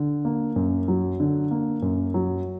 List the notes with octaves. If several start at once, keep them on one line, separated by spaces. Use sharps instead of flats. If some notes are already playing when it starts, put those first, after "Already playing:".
Already playing: D3
A#3
F#2
F#3
D3
A#3
F#2
F#3